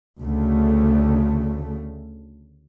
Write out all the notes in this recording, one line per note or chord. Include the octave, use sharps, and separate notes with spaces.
D2 C#3 A3